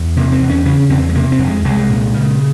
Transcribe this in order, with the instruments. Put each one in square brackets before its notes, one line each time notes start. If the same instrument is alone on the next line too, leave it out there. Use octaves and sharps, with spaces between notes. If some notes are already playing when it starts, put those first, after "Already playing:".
Already playing: [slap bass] E2
C3 A#3
C4
E2
C#4
C#3 C#4
E2 C4
G#3
C3 A#3
C4
F2
G#3
C2 G#3
A#2
C#3